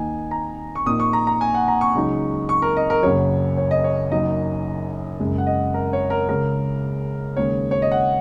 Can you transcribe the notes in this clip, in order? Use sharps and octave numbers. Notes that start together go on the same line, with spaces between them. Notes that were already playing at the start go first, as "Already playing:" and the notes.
Already playing: D#2 D#3 A#3 D#4 G#5
A#5
C#6
A#1 A#2 A#3 D#4 D#6
C#6
A#5
A#5
G#5
F#5
A#5
C#6
C#2 C#3 F#3 D#4
C#6
A#4
D#5
A#4
F#1 F#2 C#3 F#3 C#5
C#5
D#5
C#5
F#1 F#2 F#3 D#4 D#5
F#1 F#2 C#3 G#3
F#5
D#5
A#4
C#5
A#4
C#2 C#3 G#3 C#4 A#4
D#2 C#3 G#3 C#5
C#5
D#5
F#5